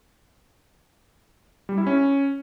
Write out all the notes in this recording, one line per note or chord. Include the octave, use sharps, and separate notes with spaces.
G3
E4
C#4